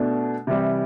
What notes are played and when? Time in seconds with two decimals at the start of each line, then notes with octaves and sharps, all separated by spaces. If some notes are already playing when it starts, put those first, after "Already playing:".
Already playing: B2 A3 D4
0.47 C3 E3 G3